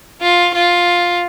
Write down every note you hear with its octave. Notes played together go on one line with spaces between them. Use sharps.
F4
F4